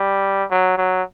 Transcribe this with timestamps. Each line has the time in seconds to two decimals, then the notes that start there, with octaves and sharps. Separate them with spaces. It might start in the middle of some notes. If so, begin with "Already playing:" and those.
Already playing: G3
0.51 F#3
0.78 F#3